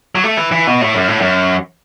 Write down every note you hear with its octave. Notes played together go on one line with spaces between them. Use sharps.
F#3
A3
E3
E3
B2
A2
F#2
A2
F#2